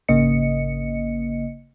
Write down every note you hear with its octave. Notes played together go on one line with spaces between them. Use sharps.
G#1 C#3 A#3 D#5 C#7